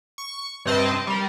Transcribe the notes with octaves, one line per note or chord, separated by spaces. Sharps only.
C#6
G2 C3 C4 D#5 A5
G3 A#4